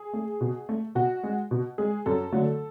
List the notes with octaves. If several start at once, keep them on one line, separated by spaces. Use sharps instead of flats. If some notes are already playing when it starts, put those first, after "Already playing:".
Already playing: G#4
A3
B2
A3
B2 F#4
G#3
B2
G#3 G#4
F#2 A4
D3 F#3 A3